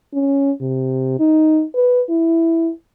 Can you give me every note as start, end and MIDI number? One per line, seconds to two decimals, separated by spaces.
0.14 0.52 61
0.61 1.18 48
1.20 1.64 63
1.75 2.02 71
2.09 2.71 64